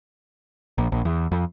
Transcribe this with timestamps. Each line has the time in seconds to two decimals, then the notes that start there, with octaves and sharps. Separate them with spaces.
0.78 A#1
0.92 A#1
1.05 E2
1.32 F2